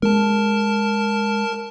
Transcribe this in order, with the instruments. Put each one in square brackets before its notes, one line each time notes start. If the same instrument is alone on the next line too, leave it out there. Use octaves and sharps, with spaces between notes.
[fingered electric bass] G#3 [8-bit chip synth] A#4 A5